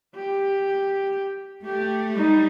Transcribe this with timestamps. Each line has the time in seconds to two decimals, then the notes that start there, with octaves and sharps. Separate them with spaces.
0.15 G4
1.65 A3 G4
2.14 G3 D#4